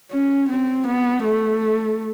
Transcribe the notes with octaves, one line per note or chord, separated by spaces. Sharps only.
C#4
C4
B3
A3